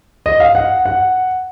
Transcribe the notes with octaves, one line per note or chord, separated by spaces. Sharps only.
D#5
F5
F#5
F#5